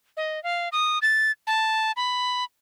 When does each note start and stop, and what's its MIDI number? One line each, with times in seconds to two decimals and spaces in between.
0.17 0.42 75
0.44 0.69 77
0.72 0.99 87
1.02 1.31 93
1.47 1.92 81
1.97 2.44 83